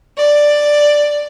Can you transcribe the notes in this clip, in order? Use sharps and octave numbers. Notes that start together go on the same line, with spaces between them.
D5